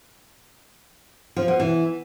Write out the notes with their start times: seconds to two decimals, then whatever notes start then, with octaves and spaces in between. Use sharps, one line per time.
1.36 F3
1.48 B2
1.60 E3